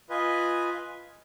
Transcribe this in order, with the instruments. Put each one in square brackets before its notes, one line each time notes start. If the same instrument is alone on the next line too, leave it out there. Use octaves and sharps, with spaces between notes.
[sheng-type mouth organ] F4 B4 D#5 G#5